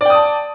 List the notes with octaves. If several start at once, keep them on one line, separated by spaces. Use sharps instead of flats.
D5 G5 A5 D#6